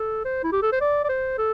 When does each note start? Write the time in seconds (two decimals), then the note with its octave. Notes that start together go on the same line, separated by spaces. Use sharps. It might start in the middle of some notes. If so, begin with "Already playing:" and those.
Already playing: A4
0.25 C5
0.44 E4
0.52 G4
0.62 A4
0.72 C5
0.81 D5
1.04 D5
1.09 C5
1.38 A4